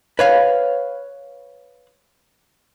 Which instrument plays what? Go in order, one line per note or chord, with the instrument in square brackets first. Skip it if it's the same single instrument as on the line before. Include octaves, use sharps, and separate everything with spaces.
[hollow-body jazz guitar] B4 C#5 F5